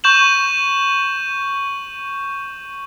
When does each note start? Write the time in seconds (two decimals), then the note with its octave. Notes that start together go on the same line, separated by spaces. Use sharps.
0.04 C#6 G6 E7 F#7